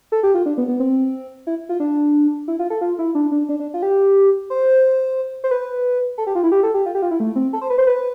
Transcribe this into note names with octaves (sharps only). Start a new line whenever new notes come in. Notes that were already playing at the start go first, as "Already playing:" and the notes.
A4
G4
F4
D4
B3
B3
C4
E4
F4
D4
E4
F4
A4
F4
E4
D4
D4
D4
D4
F4
G4
C5
C5
B4
A4
G4
F4
E4
G4
A4
G4
F4
G4
F4
E4
A3
C4
A4
C5
B4
C5
B4